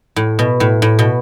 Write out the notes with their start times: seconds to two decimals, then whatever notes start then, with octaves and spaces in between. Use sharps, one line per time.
0.16 A2
0.39 B2
0.60 A2
0.82 A2
0.99 B2